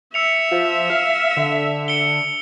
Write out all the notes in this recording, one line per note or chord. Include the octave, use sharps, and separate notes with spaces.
E5 E6 C#7 F7
F3
F5
D3
C#7 D7 G7